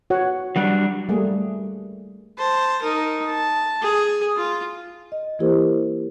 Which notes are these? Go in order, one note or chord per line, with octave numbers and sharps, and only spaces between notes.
F#4 C#5 F#5
F#3 G3 D4 F#5
G3 A3 A#3 G#4
C5 A5
D#4 A#4
A5
G#4
F4
D#5
E3 A#3 E4 G4 A#4 C5